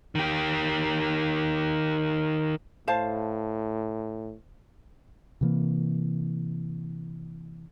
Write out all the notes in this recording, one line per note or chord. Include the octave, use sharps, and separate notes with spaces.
D#3 G4
A2 C5 F5 A5
C3 E3 A#3